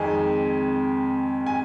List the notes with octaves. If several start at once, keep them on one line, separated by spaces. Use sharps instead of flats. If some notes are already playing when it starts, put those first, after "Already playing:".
Already playing: F2 D#3 G#3 G#5
G#5